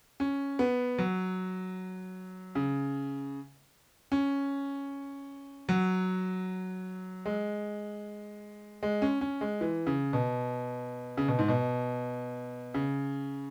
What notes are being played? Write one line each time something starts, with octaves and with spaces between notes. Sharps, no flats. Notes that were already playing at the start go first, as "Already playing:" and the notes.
C#4
B3
F#3
C#3
C#4
F#3
G#3
G#3
C#4
C#4
G#3
E3
C#3
B2
C#3
B2
G#2
B2
C#3